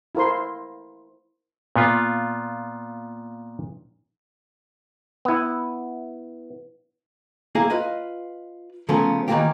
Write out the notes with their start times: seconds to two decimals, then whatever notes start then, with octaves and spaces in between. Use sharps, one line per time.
0.15 E4 F4 A#4 C5 C6
1.76 A#2 B3 F4
5.25 B3 E4
7.55 A#3 E4 G#4 D#5 F5
7.70 F4 B4 D#5
8.89 C#3 F3 A3 B3 C#4 A#4
9.28 D#3 E3 G3 A#3 F4 G4